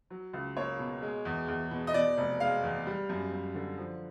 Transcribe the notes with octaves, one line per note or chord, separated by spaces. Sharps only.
F#3
C#2
A#3 C#5
B2
G#3
E2
E2
B2
D#5
B2 D5
F1
G#3 F5
E2
G3
F#2
F#2
D3
F3